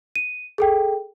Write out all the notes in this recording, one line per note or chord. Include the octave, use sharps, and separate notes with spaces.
D#7
G#4 A4 G5